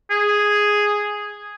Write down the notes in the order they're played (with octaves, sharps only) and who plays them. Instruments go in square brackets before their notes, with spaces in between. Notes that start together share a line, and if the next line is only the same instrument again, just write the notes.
[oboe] G#4